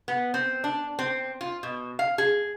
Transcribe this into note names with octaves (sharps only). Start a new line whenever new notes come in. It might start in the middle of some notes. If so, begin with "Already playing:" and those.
B3
C4
D4
C4
F4
B2
F5
G#4